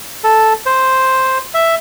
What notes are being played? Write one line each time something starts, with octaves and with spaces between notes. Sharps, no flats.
A4
C5
E5